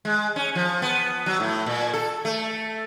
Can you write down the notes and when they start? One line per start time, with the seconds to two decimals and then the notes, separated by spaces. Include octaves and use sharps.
0.05 G#3
0.36 C#4
0.55 F3
0.82 B3
1.26 F#3
1.40 A2
1.66 A#2
1.93 A4
2.25 A3